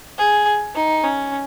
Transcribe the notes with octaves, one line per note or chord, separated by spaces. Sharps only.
G#4
D#4
C#4